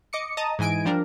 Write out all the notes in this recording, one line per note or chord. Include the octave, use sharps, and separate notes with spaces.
D#5 D6 C#7
D#5 A5 A#5 D#6
G#2 E3 D#5 G#5 D7
F3 G3 D4 A#4